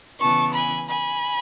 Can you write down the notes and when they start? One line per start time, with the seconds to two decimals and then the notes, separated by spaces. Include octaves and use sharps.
0.20 C#3 E3 B3 A5 C#6
0.54 G#5 B5
0.88 G#5 B5